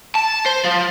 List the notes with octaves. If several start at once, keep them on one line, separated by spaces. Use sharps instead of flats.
A5
C5
F3